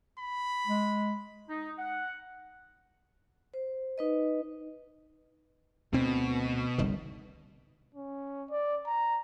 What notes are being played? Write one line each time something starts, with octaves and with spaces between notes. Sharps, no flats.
B5
G#3
D#4
F#5
C5
D#4 B4 D#5
D2 B2 C4
G1 C2 D#3
C#4
D5
A#5